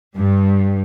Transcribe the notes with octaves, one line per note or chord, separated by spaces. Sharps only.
G2